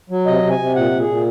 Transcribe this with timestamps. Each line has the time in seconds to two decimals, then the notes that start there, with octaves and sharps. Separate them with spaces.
0.10 F#3
0.26 C3 D#5
0.43 C3
0.50 G#5
0.59 C3
0.75 A#2 F#5
0.92 A#2
1.00 G#4
1.08 A#2